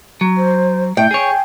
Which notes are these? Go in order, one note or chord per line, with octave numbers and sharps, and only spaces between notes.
F#3
C5
A2 E5 G5
G#4 C#5 G#5